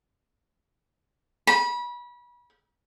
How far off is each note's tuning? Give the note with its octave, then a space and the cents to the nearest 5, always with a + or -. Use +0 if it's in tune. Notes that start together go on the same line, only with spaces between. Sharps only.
B5 -30